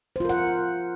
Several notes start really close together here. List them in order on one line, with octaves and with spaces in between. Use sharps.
C5 F4 A#4 F#5